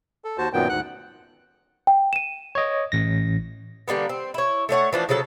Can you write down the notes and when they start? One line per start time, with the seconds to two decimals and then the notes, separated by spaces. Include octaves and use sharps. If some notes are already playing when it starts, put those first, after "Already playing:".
0.25 A4
0.38 D#2 F#4 C5 A5
0.53 F#2 A#2 D#3 F#3 B3 G5
0.69 D2 G#2 F#5 F#6
1.87 G5
2.13 D#7 E7
2.55 C#5 D#5
2.92 A1 A#6
3.88 D3 G3 A#3 B3
4.09 C4
4.34 E4 C#5
4.69 A3 D4 C#5 F#5
4.93 E3 F3 D4
5.09 C#3 F3 F#3 A4